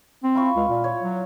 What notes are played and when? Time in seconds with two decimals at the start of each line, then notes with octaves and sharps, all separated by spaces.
0.24 C4
0.35 E4 F4 C#6
0.56 C#2
0.69 A#2
0.84 C#5
1.01 F#3